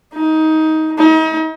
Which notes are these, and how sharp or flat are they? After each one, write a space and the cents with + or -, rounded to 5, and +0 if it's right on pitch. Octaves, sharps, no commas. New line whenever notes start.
D#4 +20
D#4 +40